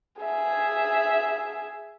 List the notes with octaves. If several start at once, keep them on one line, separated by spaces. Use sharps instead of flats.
G#4 E5